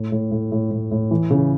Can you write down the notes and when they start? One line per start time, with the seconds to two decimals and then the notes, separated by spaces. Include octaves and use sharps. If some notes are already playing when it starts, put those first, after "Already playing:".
Already playing: A2
0.12 A2
0.32 A2
0.52 A2
0.71 A2
0.91 A2
1.11 E3
1.30 C#3